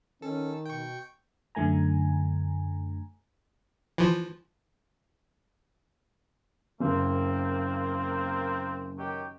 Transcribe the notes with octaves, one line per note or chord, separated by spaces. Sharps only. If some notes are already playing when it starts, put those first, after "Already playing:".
D#3 C#4 A4
B2 G5 C#6
F#2 D3 A3 G#5 A#5
E3 F3
F#1 A#3 C4
D#3 F#3 G4